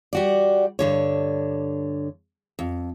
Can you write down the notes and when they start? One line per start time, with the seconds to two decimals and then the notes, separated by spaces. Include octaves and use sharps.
0.13 G3 F#4 D5
0.79 G2 D3 C#5
2.59 F2